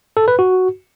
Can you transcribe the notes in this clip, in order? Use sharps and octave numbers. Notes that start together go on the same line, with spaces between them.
A4
B4
F#4